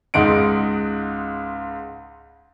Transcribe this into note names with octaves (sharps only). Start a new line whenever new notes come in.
C#2 G#2 D#4 F#5 D7